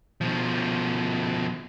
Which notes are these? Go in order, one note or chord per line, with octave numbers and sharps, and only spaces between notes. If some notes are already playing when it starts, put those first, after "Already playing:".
B2 F3